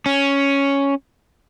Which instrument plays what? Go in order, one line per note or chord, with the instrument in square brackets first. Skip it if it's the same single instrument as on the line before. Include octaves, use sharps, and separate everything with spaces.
[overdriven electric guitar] C#4